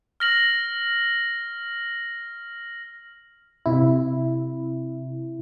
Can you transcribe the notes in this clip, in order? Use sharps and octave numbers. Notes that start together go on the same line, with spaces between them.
F6 A#6 F#7
C3 E4